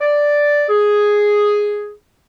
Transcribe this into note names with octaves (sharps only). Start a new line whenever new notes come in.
D5
G#4